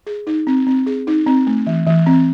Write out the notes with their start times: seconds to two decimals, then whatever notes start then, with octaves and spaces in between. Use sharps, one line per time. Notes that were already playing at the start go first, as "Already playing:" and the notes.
0.07 G#4
0.27 D#4
0.47 C4
0.67 C4
0.87 G#4
1.07 D#4
1.27 C4
1.47 A3
1.67 E3
1.86 E3
2.06 C4